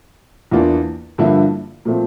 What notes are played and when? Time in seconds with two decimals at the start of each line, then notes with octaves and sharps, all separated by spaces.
0.51 E2 E3 A#3 D4 F4
1.18 G2 D3 F3 A#3 E4
1.85 A#2 F3 A3 C4